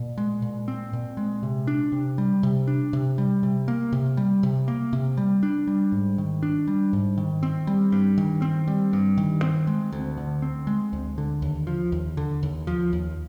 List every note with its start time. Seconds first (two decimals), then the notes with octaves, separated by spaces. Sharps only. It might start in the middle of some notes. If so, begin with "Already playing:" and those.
Already playing: A#2
0.18 G#3
0.42 A#2
0.68 C4
0.93 A#2
1.17 G#3
1.43 C3
1.67 D4
1.92 C3
2.18 G3
2.43 C3
2.67 D4
2.93 C3
3.18 G3
3.43 C3
3.68 A#3
3.92 C3
4.17 G3
4.43 C3
4.68 A#3
4.93 C3
5.17 G3
5.43 D4
5.67 G3
5.92 G#2
6.18 D#3
6.43 D4
6.68 G3
6.93 G#2
7.18 D#3
7.43 C4
7.67 G3
7.92 G2
8.18 D#3
8.42 C4
8.67 G3
8.93 G2
9.18 D#3
9.42 C4
9.67 G#3
9.92 D2
10.18 D3
10.42 C4
10.67 G#3
10.93 D2
11.18 D3
11.42 D#2
11.67 F3
11.92 D#2
12.17 D3
12.43 D#2
12.67 F3
12.93 D#2